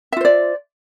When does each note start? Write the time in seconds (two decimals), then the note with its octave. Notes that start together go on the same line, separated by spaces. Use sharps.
0.12 E5
0.17 F4
0.21 C5
0.25 D5